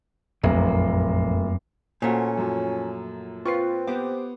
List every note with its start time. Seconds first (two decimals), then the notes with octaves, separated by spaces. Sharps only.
0.43 F1 A#1 F#2 A#3
2.02 A#2 A3 C#4 F#4 C5
2.37 F#2 F3 F#3
3.45 C4 F4 B4 C#6 C7
3.87 B3 G4 C5 D6